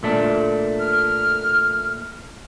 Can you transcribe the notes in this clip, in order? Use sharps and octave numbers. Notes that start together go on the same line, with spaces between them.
A#2 A3 D4
F6